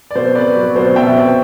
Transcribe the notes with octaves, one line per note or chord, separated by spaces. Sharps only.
D5
B2 C5
C4 B4 D5
F#3
B2 C5
B2 E5 G5
C4